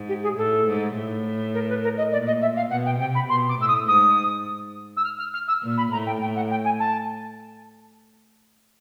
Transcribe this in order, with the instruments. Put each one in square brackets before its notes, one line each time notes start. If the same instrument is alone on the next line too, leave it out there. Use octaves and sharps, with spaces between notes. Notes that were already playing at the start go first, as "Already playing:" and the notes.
Already playing: [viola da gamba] G#2
[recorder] G4
G#4
[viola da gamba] A2 [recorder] A4
[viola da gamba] G#2
A2
[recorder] A#4
B4
A#4
D#5
[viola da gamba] A#2 [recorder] D5
[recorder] D#5
E5
F5
[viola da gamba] B2 [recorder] F#5
[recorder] G5
[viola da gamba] C3 [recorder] G5
[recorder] B5
[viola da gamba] B2 [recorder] C6
[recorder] D6
[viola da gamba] A2 [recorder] E6
[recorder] D#6
[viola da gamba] G#2 [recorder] D#6
[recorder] E6
F6
F6
F6
E6
[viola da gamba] A#2
[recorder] B5
[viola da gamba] A2 [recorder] A#5
[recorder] G5
[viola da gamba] A2 [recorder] G5
[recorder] F#5
G5
G#5
A5